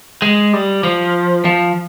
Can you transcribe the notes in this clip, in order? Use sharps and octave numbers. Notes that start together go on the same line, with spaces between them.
G#3
G3
F3
F3